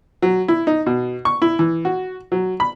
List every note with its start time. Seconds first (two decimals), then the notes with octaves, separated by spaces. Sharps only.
0.22 F#3
0.48 E4
0.67 D#4
0.86 B2
1.25 C#6
1.42 E4
1.59 E3
1.85 F#4
2.32 F#3
2.60 B5